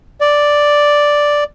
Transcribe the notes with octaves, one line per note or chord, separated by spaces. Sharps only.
D5